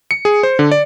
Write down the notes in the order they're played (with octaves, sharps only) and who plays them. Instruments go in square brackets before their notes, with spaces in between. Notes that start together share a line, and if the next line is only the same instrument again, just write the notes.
[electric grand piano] C#7
G#4
C5
D3
D5